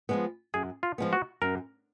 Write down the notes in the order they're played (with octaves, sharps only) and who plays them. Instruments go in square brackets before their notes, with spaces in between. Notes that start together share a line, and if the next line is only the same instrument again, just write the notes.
[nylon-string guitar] F3 G#3 B3
[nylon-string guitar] F#2 [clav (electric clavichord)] G#4
[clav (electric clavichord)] F4
[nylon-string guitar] F3 G#3 B3
[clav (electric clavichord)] F#4
[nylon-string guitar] F#2 [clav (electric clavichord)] A#4